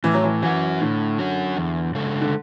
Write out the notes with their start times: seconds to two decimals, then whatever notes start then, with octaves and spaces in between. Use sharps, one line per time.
0.04 A2 E3
0.14 F#3
0.24 E3
0.42 E3 F#3 C#4 F#4
0.80 A2 D3
1.19 F#3 C#4 F#4
1.56 E2
1.95 C#3 G#3 D4 A4
2.21 D3